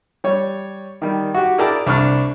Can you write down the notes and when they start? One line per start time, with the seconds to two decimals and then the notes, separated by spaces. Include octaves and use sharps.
0.24 G3 C#5
1.02 D#3 G3
1.35 F#4 G4
1.58 E4 G#4 A#4 D5 G5 A5
1.86 C2 D4 C#6 F6